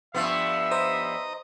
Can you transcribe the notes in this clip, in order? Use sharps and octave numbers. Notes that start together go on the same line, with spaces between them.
G2 F3 B3 E5
C5 D#5 A#5